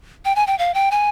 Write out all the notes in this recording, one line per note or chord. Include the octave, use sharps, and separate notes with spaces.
G5
G#5
G5
F5
G5
G#5